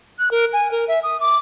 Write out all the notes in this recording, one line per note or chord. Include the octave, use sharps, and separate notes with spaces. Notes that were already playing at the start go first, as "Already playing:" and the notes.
F#6
A#4
G#5
A#4
E5
D#6
D6